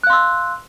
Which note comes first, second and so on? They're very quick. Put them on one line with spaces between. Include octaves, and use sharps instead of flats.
F#6 F5 C6 E6